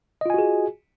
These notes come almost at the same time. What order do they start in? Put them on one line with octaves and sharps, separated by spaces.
D#5 F4 G#5 F#4 G#4